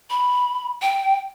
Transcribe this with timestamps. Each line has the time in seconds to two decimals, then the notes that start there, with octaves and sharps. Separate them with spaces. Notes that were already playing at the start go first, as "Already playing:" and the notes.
0.10 B5
0.82 G5